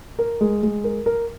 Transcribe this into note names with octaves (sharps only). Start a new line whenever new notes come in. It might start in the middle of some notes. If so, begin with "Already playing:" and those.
A#4
G#3
G#3
A#4
A#4